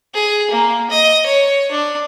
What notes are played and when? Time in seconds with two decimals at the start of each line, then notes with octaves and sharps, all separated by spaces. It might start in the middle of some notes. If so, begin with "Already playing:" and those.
0.14 G#4
0.51 A#3
0.90 D#5
1.26 C#5
1.71 D4